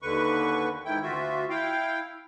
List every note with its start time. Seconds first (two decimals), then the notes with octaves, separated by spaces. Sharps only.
0.02 D#2 D3 B4 C#6
0.85 G#2 D#3 E4 G5
1.03 D2 F4 F#4 E5
1.50 E4 F5 G5